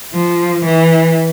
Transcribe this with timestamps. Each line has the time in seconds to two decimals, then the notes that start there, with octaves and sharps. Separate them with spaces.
0.14 F3
0.65 E3